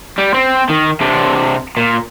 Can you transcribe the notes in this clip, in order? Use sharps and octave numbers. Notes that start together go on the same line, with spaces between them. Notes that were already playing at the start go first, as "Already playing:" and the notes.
G3
C4
D#3
C3 D4
A#2